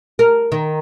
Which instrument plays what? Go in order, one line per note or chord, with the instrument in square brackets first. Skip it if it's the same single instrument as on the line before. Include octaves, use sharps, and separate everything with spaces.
[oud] A#4
D#3